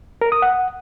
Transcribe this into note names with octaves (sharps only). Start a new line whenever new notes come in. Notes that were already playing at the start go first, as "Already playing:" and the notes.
A#4
D#6
F#5